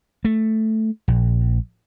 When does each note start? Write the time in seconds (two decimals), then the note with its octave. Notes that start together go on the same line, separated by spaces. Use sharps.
0.25 A3
1.08 A#1